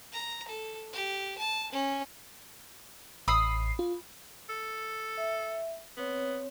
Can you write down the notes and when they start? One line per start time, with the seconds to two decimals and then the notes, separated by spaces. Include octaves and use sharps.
0.12 A#5
0.48 A4
0.93 G4
1.38 A5
1.72 C#4
3.28 A1 B5 D#6 E6 C7
3.79 F4
4.49 A4
5.17 E5
5.97 B3 C4 C#5